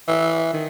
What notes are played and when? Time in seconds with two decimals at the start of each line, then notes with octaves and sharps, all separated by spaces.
0.08 E3
0.53 D#3